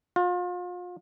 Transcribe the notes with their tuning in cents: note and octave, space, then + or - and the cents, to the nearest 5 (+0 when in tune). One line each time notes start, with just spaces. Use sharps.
F4 +35